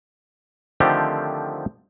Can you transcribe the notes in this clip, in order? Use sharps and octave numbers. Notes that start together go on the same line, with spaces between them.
D3 D#3 F3 A3 C4 G4